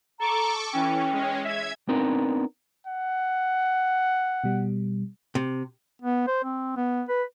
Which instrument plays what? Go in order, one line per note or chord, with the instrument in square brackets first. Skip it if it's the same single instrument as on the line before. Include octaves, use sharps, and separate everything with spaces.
[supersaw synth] A4 C#6 D6 [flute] A#5
[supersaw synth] E3 C#4 [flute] G5
[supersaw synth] G#3 C#4
E5 G#6
[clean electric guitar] B3 C4 D4 D#4 A#4
[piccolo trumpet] F#5
[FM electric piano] B2 G3
[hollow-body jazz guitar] C3
[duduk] B3
C5
C4
B3
B4